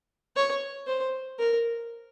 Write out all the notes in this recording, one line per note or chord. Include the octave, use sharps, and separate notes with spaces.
C#5
C5
A#4